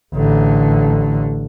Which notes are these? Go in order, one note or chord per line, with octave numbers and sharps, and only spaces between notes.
A1 D3